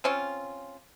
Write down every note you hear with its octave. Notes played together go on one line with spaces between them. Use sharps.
C4 C#4 F4